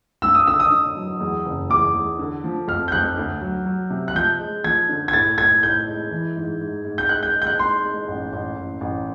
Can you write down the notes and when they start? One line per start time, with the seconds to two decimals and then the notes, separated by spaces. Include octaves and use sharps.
0.22 G2 E6
0.35 D#6
0.47 D3 E6
0.60 D#6
0.72 D3
0.96 F#3
1.20 E2
1.46 F#1
1.70 E2 D6
1.94 E2
2.19 D3
2.44 F3
2.68 F2 F6
2.88 G6
2.92 F2 F#6
3.18 D2
3.42 F#3
3.66 F#3
3.90 C3
4.08 F#6
4.15 F3 G6
4.39 G#3
4.64 F3 G#6
4.89 D3
5.08 G#6
5.13 A2 A6
5.37 A2 G#6
5.63 A2 G6
5.88 G#3
6.11 E3
6.36 G#2
6.61 G#2
6.85 G#2
6.98 G6
7.09 G#3 F#6
7.23 G6
7.35 G#3
7.42 G6
7.47 F#6
7.59 G#3 C6
7.83 G#3
8.08 A1
8.33 A1
8.57 A1
8.81 A1